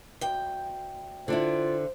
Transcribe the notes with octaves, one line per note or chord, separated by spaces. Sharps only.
D2 G5
D3 D4 E4 F4 C5